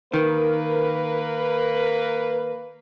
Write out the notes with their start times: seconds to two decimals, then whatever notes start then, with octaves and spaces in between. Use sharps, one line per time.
0.14 D#3 A#3 A#4 B4